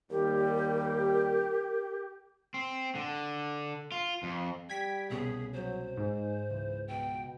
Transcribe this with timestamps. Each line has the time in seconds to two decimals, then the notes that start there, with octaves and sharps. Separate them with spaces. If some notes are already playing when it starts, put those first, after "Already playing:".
0.11 D#2 G3 G4 A#4
2.54 C4
2.95 D3
3.92 F4
4.23 F2
4.70 G3 G5 G#6 B6
5.10 C2 B2 C#4 G#4
5.54 F#3 C5
5.97 G#2 G#3
6.50 C#2 E3
6.88 B2 G5